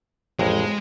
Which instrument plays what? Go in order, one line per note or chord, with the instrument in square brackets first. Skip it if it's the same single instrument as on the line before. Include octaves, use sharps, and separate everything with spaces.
[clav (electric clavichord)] A1 F2 [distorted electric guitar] G#3